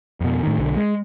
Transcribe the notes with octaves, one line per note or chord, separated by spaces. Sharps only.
F2 B2
A2 D#3
B1 D3
G#3